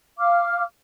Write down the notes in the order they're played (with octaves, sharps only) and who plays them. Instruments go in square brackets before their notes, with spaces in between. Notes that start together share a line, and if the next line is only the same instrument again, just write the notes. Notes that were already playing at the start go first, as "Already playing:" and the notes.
[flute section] F5 D6 F6